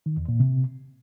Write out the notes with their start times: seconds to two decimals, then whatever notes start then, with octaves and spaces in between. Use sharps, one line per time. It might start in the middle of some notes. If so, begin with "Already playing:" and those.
0.06 D#3
0.17 E2
0.29 A#2
0.40 C3